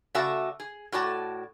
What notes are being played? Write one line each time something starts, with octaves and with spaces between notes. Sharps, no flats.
C#3 A3 F#4 D5 E5 A5
G#4
A2 F#4 D5 A5